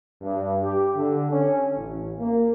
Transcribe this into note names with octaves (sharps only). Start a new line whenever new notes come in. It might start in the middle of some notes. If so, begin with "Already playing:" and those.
G2
G4
D3
C#4
A1
A#3